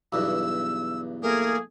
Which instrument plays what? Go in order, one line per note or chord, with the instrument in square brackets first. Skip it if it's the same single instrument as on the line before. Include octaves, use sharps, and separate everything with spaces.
[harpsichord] B1 E2 G2 [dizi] E6
[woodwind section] A3 A#3 G#4 [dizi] A#4